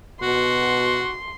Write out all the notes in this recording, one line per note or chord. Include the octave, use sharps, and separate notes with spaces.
B2 F#4 C6